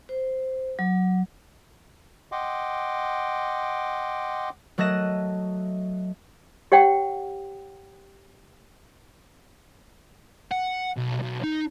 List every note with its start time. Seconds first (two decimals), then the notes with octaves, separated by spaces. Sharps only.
0.09 C5
0.79 F#3
2.32 D#5 F#5 G5 C6 D6
4.78 F#3 A3 D#5 F#6 A#6 E7
6.72 G4 C#5 F#5 G5
10.52 F#5
10.97 B1
11.22 B1
11.44 D#4